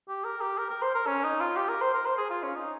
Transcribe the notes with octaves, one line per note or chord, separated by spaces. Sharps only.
G4
A#4
G4
A#4
A#4
C5
A#4
C#4
D#4
F4
G4
A#4
C5
A#4
C5
G#4
F4
C#4
D#4